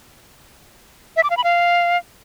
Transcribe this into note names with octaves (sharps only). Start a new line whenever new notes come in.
E5
D6
F5
B5
F5